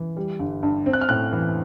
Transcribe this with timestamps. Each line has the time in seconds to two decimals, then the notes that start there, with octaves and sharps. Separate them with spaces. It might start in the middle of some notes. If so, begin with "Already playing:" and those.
Already playing: E3
0.17 G3
0.39 G1
0.63 G2
0.86 C4
0.93 F#6
1.01 F6
1.09 A2 F#6
1.33 E3